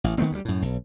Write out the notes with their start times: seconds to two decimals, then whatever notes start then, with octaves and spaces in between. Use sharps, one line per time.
0.04 A1
0.18 D#3 A3 B3 C4
0.31 D2 E3 G3
0.45 F#2 A2
0.62 B1